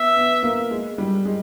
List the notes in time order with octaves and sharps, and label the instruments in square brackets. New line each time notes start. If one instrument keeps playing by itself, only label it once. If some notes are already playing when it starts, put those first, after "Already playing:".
Already playing: [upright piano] B3 [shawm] E5
[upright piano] B3
A#3
G#3
G3
G#3